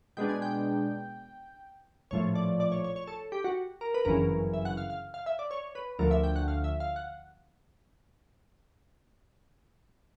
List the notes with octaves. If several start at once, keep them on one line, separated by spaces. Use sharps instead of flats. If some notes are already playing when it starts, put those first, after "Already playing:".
B2 G#3 B3 D4 G5
G#5
G5
A#1 A2 F3 A3 C#5
D5
D5
C#5
C#5
C#5
A4
G4
F#4
A#4
B4
G1 F#2 C#3 E3 A#4
E5
F#5
F5
F5
F5
E5
D5
C#5
B4
D2 D3 F3 A3 A#4
E5
G5
F#5
F5
E5
F5
F#5